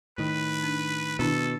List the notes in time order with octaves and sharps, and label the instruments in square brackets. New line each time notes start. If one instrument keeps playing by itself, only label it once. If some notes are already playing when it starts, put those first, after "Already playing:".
[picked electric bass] A2 D#3 [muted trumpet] B4
[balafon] D4
[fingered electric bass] B2 [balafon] D#3 D4 E4 [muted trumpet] A4